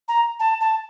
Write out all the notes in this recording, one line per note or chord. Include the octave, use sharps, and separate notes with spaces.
A#5
A5
A5